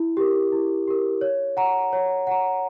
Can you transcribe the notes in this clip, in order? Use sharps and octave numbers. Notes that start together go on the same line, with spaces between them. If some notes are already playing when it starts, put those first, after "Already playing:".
Already playing: E4
G4 A#4
E4
G4 A#4
C#5
F#5 A#5
C#5
F#5 A#5